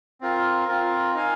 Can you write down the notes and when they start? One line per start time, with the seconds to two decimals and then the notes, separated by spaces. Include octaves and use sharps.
0.21 C4 F4 A#4
0.68 C4 F4 A#4
1.14 D#4 A#4 F5 G#5